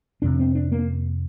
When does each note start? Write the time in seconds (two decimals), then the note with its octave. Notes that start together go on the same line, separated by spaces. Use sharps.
0.22 F2 C3 D4
0.39 C4
0.55 D4
0.72 A#3